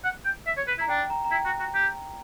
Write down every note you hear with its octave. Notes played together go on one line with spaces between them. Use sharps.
F#5
G5
E5
C#5
B4
E4
A#5
D4 G5
A#5
A#5
E4 G5
F#4
F#4
G4